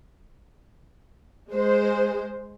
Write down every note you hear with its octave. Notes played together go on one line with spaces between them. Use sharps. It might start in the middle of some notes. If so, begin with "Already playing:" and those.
G#3 C5